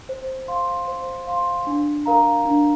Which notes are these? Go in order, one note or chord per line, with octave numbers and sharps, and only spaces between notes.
C5
F5 C6
C5
F5 C6
D4
A#4 F5 A#5
D4